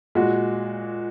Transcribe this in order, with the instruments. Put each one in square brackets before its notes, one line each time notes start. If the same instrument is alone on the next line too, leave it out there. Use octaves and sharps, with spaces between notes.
[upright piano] A#2 G#3 F#4